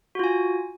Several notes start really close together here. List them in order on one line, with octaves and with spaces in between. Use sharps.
F#4 F4 G#5